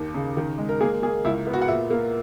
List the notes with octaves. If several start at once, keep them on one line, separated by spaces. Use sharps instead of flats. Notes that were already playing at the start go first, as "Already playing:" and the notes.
Already playing: D#2 D#3
C#3
D#3
G#3
A#4
A#3 G#4
A#3 G#4
C#2 E4
B3
F#4
F#5
A#2 E5
A#3